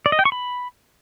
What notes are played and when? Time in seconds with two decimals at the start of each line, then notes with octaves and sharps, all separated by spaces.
0.06 D5
0.12 D#5
0.19 G5
0.25 C#6
0.32 B5